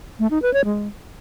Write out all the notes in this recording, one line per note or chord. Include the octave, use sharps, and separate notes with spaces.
A3
D#4
B4
C#5
G#3